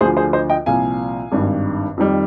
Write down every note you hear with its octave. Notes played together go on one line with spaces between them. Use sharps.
D2 D3 F3 G#4 C5
G#4 C5
C5 D#5
D#5 G5
C2 A#2 F3 F5 G#5
G#1 G2 D#3
F2 D#3 G3